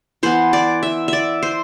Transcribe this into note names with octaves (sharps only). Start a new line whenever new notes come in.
E3 B3 C5
D5
E5
D5 E5
C5